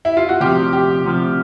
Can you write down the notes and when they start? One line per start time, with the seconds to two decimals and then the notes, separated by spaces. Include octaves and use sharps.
0.05 E4
0.17 F4
0.29 F#4
0.41 D2 C3 F3 G4
0.73 G4
1.04 D2 C3 F3